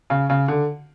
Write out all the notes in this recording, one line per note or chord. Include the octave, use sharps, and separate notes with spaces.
C#3
C#3
D3